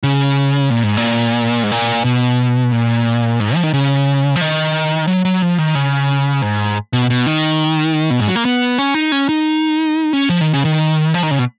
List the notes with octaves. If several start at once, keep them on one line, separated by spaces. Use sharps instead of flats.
C#3
A#2
G#2
A#2
G#2
A#2
B2
A#2
G#2
F3
D#3
C#3
F3
D#3
F#3
F#3
F3
D#3
C#3
G#2
B2
B2
D#3
B2
G#2
F#3
A#3
B3
C#4
D#4
C#4
D#4
C#4
F3
D#3
C#3
D#3
F3
D#3
C#3
B2